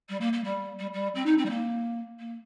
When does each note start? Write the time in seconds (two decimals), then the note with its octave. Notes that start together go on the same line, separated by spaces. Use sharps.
0.09 G3
0.20 A#3
0.33 A#3
0.44 G3
0.79 G3
0.93 G3
1.15 C4
1.26 D#4
1.38 C4
1.45 G3
1.49 A#3
2.19 A#3